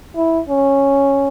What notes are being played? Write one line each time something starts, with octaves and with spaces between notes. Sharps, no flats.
E4
C#4